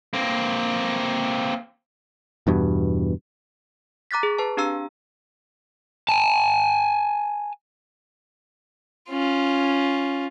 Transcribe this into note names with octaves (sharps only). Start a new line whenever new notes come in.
A#3 C4
E2 G2 B2
A#5 D6 F#6 A6 B6
G#4
B4 A5
C4 D4 G4 F5 A#5 E6
G#5 A5
C#4 F4